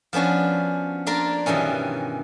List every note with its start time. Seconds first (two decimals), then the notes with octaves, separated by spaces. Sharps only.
0.13 F3 B3 C#4 D4 F#4
1.07 A#3 D4 F4 A#4 D5
1.46 G2 B2 D#3 E3 C#4